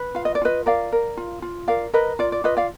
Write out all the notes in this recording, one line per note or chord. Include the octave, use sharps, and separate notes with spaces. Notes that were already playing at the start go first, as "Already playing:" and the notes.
Already playing: B4
F4 F5
D#5
D5
F4 B4 D#5
A#4 D5 F5
A#4
F4
F4
A#4 D5 F5
A#4 B4 D#5
F4 D5
D5
F4 B4 D#5
D5 F5